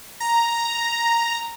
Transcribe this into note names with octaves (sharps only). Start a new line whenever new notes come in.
A#5